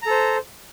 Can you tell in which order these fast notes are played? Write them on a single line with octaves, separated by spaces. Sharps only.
A#5 A4 C5